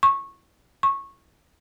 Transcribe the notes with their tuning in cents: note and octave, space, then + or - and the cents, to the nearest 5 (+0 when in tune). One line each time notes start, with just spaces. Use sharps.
C#6 -15
C#6 -15